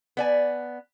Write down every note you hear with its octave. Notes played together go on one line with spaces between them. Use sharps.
B3 D5 G#5